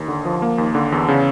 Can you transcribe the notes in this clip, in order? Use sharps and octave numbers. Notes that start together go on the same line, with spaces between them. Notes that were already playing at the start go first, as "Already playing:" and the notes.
Already playing: D#2
D3
F3
A#3
D#2
D3
E2
C#3